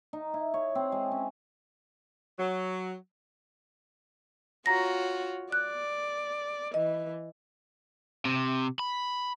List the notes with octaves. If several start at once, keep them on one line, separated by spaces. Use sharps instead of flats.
D#4
E4
C#5
C4
G#3
C#4
F#3
F4 F#4 C#5 A#5 A#6
D5 F#6
E3 D#5
C3
B5